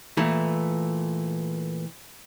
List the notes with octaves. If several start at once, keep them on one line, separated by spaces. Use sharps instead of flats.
A#2 E3 A3